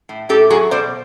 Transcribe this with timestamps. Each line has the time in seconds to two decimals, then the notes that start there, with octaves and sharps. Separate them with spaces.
0.09 A2
0.29 A2 G4 A4
0.50 F#3 F#4 G#4
0.71 B2 C5 D5